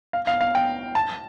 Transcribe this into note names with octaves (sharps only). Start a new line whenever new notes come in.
F5
F5
F5
G5
A5